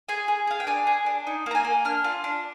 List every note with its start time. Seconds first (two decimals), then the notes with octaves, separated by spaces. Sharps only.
0.08 G#4 G#5
0.28 G#4
0.47 G#4 F5
0.60 G5
0.67 D4 G#5
0.87 G#4
1.06 D4
1.27 D#4
1.46 A#3 A#5
1.55 G#5
1.65 A#3
1.85 D4 F6
2.04 F4
2.24 D4